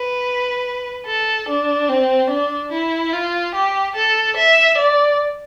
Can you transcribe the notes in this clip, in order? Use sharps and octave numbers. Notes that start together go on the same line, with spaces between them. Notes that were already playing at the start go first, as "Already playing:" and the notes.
Already playing: B4
A4
D4
C4
D4
E4
F4
G4
A4
E5
D5